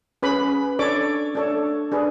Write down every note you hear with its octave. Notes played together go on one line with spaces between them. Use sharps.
C#4 G#4 B4 B5
D4 A4 C#5 D5 D6
D4 A4 C#5
D4 G#4 B4